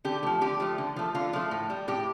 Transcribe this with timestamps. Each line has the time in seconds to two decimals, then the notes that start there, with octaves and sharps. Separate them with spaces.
0.05 D3 G4
0.23 F3 A3
0.41 D3 G4
0.60 F3 A3
0.78 D3
0.96 F3 A3
1.15 D3 F4
1.33 F3 A3
1.51 A2
1.70 G3
1.88 A2 G4